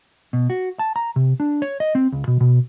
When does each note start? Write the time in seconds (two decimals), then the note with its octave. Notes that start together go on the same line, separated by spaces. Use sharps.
0.33 B2
0.50 F#4
0.79 A5
0.96 A#5
1.16 C3
1.40 D4
1.62 C#5
1.80 D#5
1.95 C4
2.12 C#2
2.27 B2
2.41 B2